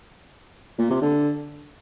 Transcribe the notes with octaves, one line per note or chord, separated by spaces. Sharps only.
A#2
C3
D3